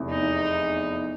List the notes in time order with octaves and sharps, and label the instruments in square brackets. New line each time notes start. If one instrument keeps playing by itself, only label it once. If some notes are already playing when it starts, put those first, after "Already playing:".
Already playing: [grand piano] F1 E2 C3
[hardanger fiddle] D#4